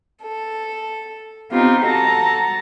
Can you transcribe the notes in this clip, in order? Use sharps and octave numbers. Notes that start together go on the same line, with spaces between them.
A4
B3 C4 D#4 F4 G4
F#4 A4 A5 A#5